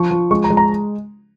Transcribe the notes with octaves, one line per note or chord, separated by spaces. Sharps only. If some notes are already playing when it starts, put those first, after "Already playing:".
Already playing: F3 C#6
F3
G#3 C#6
A#5
G#3
A#5